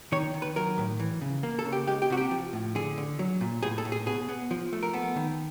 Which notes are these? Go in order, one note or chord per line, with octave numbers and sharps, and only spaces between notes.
D#3 C#5
D#3
B4
F#3 A#4
A2
E3
C#3
A#3
A4
C#3
G4
G#3 G4
G4
C3 F#4
G4
F3
A2
D3 G#4
D3
F#3
A#2
A2 G#4
A4
A2
G#4
B2 G#4
B3
F3
A3
A#4
B3 A4
D#3